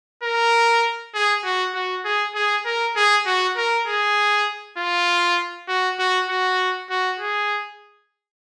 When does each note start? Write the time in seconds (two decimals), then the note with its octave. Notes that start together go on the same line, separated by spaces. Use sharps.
0.23 A#4
1.14 G#4
1.44 F#4
1.75 F#4
2.05 G#4
2.35 G#4
2.65 A#4
2.96 G#4
3.26 F#4
3.57 A#4
3.87 G#4
4.78 F4
5.68 F#4
5.99 F#4
6.29 F#4
6.90 F#4
7.19 G#4